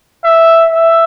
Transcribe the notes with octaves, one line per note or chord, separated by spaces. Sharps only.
E5
E5